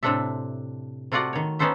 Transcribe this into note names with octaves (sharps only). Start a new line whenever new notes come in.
A2 C3 C4 D4 A4 E5
C3 A3 F4 F#4 D5 F#5
D#3 C#5
B3 C#4 D#4 A4 C5 E5